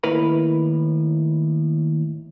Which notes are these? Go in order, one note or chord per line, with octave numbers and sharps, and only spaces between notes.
D#2 A2 E4 A#4 B4 B5